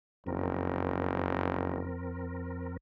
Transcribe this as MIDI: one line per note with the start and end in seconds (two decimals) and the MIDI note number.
0.27 1.85 30
0.27 2.77 41
0.27 2.77 60
0.27 2.77 70